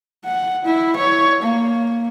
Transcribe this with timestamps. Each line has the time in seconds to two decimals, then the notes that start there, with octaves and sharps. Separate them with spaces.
0.25 F#5
0.65 E4
0.97 C#5
1.43 A#3